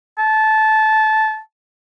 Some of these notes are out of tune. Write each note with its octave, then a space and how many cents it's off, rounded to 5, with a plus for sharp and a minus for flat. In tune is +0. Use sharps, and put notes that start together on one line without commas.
A5 -15